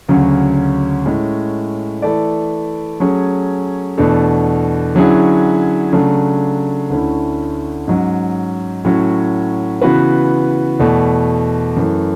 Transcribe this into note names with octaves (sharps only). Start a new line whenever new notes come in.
D2 C#3 F#3 C#4
A2 G#3 C#4
E3 A3 E4 A4 D5
F#3 A3 C#4 G#4
E2 B2 A3 D4 A4
D3 F#3 C#4 E4 G#4
C#3 F#3 A3 D4
D2 D3 A3 C#4 E4
G#2 F#3 C#4
A2 F#3 C#4 F#4
C#3 E3 B3 F#4 B4
E2 B2 A3
F#2 E3 A3